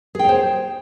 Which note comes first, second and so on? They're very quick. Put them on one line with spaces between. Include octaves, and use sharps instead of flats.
G#4 G5 C#5 C5